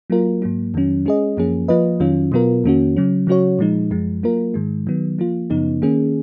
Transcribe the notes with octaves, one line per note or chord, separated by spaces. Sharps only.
F#3 A#3 F4 A#4
G#2 F#3 A#3
F2 D#3 F#3 C#4
G#3 C#4 G#4 D#5
F#2 F3 A#3 C#4 G#4
F3 A#3 F4 B4 D#5
F2 D#3 F#3 C#4 F4
B2 F#3 B3 F4 A#4
F2 D#3 A#3 C#4 F#4
C#3 F#3 C#4
C#3 F#3 C#4 F#4 C#5
A#2 F3 G#3 D#4
F#2 F3 G#3
F#3 A#3 F4 A#4
G#2 D#3 G#3
D#3 F#3 B3
F3 A#3 F4
F#2 C#3 F3 B3 D#4
D#3 A#3 C#4 G#4